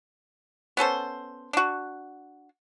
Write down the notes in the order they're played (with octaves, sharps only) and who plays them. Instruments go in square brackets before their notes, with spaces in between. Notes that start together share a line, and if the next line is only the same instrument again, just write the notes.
[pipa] B3 C#4 A4 C5
D4 F#4